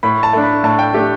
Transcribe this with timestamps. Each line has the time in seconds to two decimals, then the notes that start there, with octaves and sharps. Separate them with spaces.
0.03 A2 B5
0.23 A5
0.33 A3 D4
0.43 B5
0.63 A2 A5
0.79 G5
0.94 A3 D4 G4